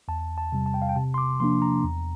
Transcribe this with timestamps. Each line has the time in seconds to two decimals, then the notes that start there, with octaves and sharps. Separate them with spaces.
0.08 E2 A5
0.38 A5
0.52 C3 G3
0.66 A5
0.74 G5
0.82 F5
0.89 G5
0.96 C3 A5
1.14 C6
1.18 D6
1.40 F3 A#3 D4 C6
1.62 A#5
1.83 E2